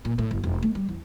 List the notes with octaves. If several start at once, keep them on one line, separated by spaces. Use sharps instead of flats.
A#2
A2
F#1
E1
A3
G3
E2